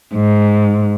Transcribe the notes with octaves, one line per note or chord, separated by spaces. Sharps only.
G#2